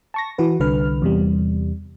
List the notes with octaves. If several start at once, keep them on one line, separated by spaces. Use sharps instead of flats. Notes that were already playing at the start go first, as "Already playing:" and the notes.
A5 C#6 A#6
E3 F#4 B4
C2 D3 B4 F6
E2 C3 G3